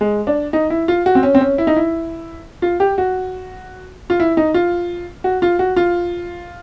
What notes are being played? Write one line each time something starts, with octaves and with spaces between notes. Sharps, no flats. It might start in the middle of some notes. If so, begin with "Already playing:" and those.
G#3
D4
D#4
E4
F4
F#4
C4
C#4
C4
C#4
E4
D#4
E4
F4
G4
F#4
F4
E4
D#4
F4
F#4
F4
F#4
F4